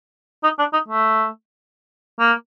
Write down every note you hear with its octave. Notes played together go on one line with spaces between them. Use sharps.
D#4
D4
D#4
A3
A#3